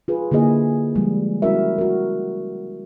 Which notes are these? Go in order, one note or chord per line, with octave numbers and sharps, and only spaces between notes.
F4 G#4 B4
D3 A#3 E4 G#4 D#5
F3 G3 G#3
G3 C#4 E4 F#4 A#4 E5
F#4 A#4